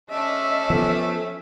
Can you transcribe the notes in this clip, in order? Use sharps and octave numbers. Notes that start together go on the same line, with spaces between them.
A3 C#4 D4 D#5 E5
F3 B3 A4